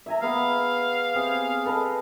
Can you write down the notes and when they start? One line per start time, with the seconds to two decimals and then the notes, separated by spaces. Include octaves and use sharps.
0.06 E5 G#5 A#5
0.22 B3 G#4 F5
1.15 C4 G4 G#4
1.65 A4 B4 D#5